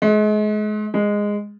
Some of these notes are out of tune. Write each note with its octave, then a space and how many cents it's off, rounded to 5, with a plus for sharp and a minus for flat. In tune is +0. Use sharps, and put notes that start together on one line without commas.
G#3 +35
G#3 -10